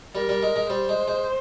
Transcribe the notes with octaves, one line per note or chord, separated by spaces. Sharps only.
G3 A#4
G3
G#3
G#3
G3 C5
G#3
G#3